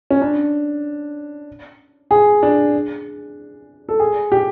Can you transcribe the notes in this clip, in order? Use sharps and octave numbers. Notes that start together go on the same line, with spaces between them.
C#4
D4
G#4
D4
A4
G#4
G4